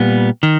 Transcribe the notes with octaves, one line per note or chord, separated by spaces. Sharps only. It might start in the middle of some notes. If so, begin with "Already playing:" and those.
Already playing: A#2 G3 B3
D#3